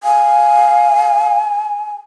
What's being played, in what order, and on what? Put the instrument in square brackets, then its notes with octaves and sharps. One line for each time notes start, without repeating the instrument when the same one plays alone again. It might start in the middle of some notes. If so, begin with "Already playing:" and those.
[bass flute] F5 [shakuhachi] G#5